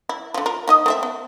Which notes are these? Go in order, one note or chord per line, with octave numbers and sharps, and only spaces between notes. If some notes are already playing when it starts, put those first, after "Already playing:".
E4
D3 F3
F4 A#4
D#3 D#4 D#5
A3 C4 E5
B3